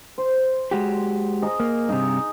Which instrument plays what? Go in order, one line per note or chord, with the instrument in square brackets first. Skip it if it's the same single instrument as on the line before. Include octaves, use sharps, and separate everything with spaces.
[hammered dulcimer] C5
[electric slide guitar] G#3 F#4 G4
[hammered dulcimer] G#4 D#5 A#5
[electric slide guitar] A#3
[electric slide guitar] G2 C3 [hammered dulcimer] D#4